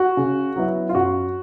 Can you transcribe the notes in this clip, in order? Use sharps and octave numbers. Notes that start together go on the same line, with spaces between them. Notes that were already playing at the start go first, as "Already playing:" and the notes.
Already playing: F#4
C#3
F#3 B3 E4
F4
F#2 F#4